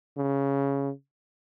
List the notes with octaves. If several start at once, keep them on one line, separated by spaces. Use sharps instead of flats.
C#3